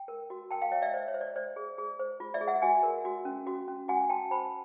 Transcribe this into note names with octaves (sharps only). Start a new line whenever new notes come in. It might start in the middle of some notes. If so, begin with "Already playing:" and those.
Already playing: G5
A#4
F#4
A#4 G5 A5
F5 G5
C#5 D#5 F5
D5 E5
C5 D5
C#5
C5
D5
C5 D5
G#4
G#4
C5
F4
D5 E5
G#4
E5 F#5
F#4 F#5 G#5
A#4
F#4
C#4
F#4
C#4
F#4 F#5 G#5
F#4 G5 A5
C5 A5 B5